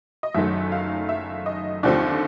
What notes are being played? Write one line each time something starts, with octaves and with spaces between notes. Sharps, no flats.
D#5
F#1 F#2 D#3 F#3 A3 E5
F5
E5
D#5
D#2 D3 F3 A3 C4 D5